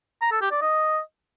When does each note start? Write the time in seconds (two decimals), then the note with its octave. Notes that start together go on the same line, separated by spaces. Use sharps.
0.21 A#5
0.31 A4
0.41 G4
0.51 D5
0.61 D#5